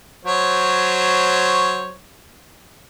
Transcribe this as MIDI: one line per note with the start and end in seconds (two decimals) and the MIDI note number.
0.25 1.95 54
0.25 1.95 72
0.25 1.95 73